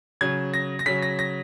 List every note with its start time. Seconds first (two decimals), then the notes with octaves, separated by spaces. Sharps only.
0.21 C#3 F#3 G#6
0.54 A#6
0.79 A#6
0.86 C#3 F#3 B6
1.02 A#6
1.19 A#6